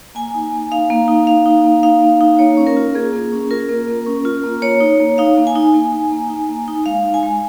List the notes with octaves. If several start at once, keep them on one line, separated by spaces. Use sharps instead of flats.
A#3 G#5
D#4
A#3
D#4 F5
A#3
D#4
A#3 F5
D#4
A#3
D#4 F5
A#3
D#4
A#3 C#5
C#4
A#4
F4
A#3 G#4
A#3
C#4
F4 A#4
A#3
A#3
C#4
F4
A#3
A#3 C#5
D#4
A#3
D#4 F5
A#3
G#5
D#4
A#3
D#4
A#3
D#4
A#3
D#4
G#3 F5
D#4
G#5
G#3